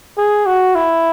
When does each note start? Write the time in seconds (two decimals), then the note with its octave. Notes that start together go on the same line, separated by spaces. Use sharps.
0.18 G#4
0.46 F#4
0.75 E4